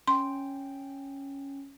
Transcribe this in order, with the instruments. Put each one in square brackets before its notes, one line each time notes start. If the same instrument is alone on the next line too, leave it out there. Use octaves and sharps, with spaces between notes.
[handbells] C#4 G5 [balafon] C6